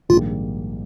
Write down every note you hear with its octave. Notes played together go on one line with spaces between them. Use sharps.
A#1 G#2 D#3 G3 A#3 F4